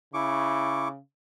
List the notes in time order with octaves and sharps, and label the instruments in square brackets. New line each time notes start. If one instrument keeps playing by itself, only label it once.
[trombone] C#3 [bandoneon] E4 [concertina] C#6 D6